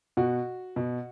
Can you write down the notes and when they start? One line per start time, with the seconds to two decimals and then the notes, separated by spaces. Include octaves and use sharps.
0.17 B2 F#4
0.76 B2